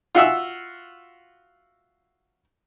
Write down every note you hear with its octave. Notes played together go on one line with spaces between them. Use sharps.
F4 F#4 E5 E6